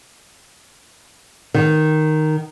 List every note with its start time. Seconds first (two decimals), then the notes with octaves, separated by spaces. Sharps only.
1.54 D#3